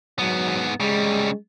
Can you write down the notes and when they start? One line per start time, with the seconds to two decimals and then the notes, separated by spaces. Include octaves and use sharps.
0.19 G#2 F#3 B3
0.80 C#3 G3 G#3